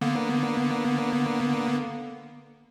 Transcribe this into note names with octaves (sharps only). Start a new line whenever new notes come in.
D3 A#3 B3